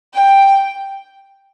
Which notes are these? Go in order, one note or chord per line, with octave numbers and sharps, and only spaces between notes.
G5